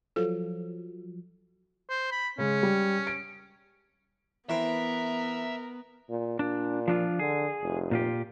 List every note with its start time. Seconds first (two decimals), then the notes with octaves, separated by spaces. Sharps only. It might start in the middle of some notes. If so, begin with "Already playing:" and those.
0.16 F3 F#3 A4
1.90 C5
2.12 B5
2.38 C#3 G#3 C#4
2.63 G3
3.07 D7
4.50 E3 B3 C4 A#4 E5
6.09 A#2
6.39 A#2 D4
6.88 F3 D4 F4
7.19 D3 G#4
7.63 F1
7.91 A#2 F4 G4